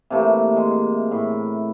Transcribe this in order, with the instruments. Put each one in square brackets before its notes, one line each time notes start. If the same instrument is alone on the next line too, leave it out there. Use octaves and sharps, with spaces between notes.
[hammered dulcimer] C3 E3 A3 A#3
G#3
A2